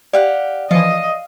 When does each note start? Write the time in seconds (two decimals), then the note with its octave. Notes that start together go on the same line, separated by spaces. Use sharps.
0.13 G4 D5 F5 F#5
0.71 E3 F3 D#5 F5